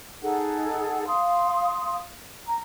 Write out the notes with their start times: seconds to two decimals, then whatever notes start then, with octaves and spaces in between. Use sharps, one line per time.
0.22 D#4 G#4 A4 F#5
1.07 F5 C6 D#6
2.46 A#5